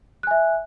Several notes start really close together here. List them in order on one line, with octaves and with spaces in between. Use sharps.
F#6 G#5 E5